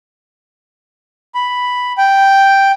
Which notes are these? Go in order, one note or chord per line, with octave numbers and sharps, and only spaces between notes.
B5
G5